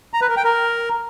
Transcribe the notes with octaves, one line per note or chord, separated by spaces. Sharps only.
A#5
B4
A#4
G5
A#4